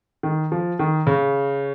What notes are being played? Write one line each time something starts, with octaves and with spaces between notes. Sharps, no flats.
D#3
F3
D#3
C#3